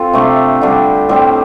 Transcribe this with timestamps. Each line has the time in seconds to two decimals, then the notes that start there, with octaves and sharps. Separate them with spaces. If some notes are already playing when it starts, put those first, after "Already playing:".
Already playing: C4 F4 A4
0.13 C3 A3 D4 G4
0.61 D3 G3 D4
1.09 A2 G3 C4